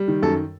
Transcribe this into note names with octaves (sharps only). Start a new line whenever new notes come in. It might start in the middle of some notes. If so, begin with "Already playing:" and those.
Already playing: G3
D#3
F#2 A4